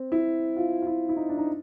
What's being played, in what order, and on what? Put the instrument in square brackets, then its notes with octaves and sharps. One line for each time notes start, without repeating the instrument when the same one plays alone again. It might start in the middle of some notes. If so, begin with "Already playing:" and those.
Already playing: [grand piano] C4
E4
F4
F4
E4
E4
D#4
D4
D#4